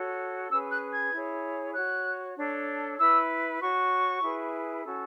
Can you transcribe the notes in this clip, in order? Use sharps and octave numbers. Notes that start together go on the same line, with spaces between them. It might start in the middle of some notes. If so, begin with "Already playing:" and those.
Already playing: F#4 A4 C#5
C#4 G#4 B4 E6
F#6
G#6
E4 G#4 C#5
F#4 C#5 F#6
D4 A4 C#5
E4 B4 E6
F#4 C#5 C#6
E4 G#4 B4
C#4 F#4 A4